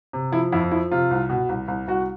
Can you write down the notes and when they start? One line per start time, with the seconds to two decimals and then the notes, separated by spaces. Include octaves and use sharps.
0.13 C3
0.32 F3 E4
0.52 F2 E4
0.71 F3 E4
0.92 C3 F4
1.11 C2
1.29 B2
1.49 C2
1.68 C2
1.87 C2 F#4